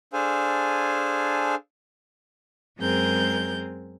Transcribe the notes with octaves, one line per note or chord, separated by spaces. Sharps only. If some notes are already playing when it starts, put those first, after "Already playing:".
D4 G#4 A4 C5 F5 G#5
F#2 G#3 C4 G#4 A#4 G6